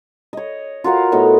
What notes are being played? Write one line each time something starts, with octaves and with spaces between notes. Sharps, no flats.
C#5 D#5
F4 F#4 A#4 F5
A2 B3 F#4 D#5